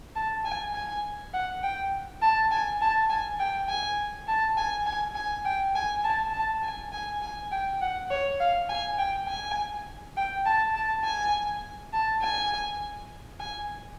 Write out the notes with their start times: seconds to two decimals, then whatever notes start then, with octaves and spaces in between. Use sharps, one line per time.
0.15 A5
0.45 G#5
0.74 G#5
1.33 F#5
1.63 G5
2.22 A5
2.51 G#5
2.81 A5
3.10 G#5
3.40 G5
3.69 G#5
4.28 A5
4.57 G#5
4.86 G#5
5.15 G#5
5.45 G5
5.75 G#5
6.04 A5
6.33 A5
6.63 G#5
6.92 G#5
7.22 G#5
7.51 G5
7.81 F#5
8.10 C#5
8.40 F5
8.69 G#5
8.98 G5
9.28 G#5
10.16 G5
10.45 A5
10.75 A5
11.05 G#5
11.93 A5
12.22 G#5
13.40 G#5